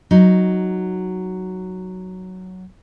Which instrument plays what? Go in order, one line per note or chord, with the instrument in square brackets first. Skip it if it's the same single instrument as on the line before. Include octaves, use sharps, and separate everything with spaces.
[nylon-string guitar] F#3 D#4